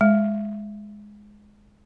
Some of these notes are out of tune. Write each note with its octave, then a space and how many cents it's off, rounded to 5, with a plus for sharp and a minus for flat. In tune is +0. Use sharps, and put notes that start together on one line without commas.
G#3 +0 F5 +0